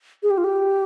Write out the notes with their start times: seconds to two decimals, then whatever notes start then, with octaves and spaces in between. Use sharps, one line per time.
0.23 G#4
0.31 G4
0.38 F4
0.44 G4